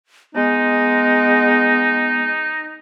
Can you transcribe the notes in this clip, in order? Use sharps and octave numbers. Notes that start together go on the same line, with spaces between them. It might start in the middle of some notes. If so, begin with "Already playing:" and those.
G#3 B3 D#4